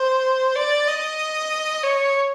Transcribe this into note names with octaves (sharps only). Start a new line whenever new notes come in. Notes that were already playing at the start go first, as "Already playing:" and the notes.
Already playing: C5
D5
D#5
C#5